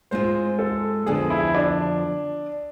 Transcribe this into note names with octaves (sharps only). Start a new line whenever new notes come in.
G#2 G#3 C4 F4 C5
A4
F2 D3 F3 B3 G#4
E4
D4